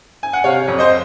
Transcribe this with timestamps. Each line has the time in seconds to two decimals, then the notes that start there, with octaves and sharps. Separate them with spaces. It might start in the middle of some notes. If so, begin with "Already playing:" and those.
0.23 G#5
0.33 F#5
0.44 C3 C#5 F5
0.68 F2
0.79 C5 D#5